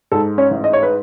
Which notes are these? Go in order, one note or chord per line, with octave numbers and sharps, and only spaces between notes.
G#2 A4
C#4 C#5
A1
D#5
C#5
B4